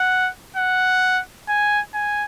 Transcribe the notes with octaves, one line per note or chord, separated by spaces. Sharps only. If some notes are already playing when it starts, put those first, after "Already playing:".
Already playing: F#5
F#5
G#5
G#5